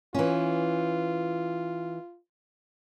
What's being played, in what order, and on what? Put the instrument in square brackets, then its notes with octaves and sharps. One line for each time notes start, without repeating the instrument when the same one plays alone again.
[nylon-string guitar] E3 C#4 [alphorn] F4